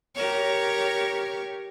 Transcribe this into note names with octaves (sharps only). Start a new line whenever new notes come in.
G4 A#4 C#5